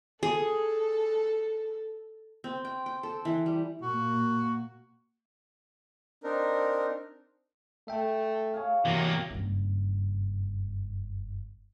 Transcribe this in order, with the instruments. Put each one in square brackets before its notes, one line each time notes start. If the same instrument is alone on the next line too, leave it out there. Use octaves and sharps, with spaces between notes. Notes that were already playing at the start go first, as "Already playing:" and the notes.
[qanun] G#4 [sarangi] A4
[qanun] C4
G5
G5
A4
E3
G3
[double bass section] A#2 A#3 [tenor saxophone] F#4
[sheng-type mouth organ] C4 D4 D#4 A#4
[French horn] A3 [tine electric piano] E5 G5
[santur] G#4 C#5 F5
[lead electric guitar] C3 A#3 [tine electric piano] E3 [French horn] F#3
[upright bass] F#1 G2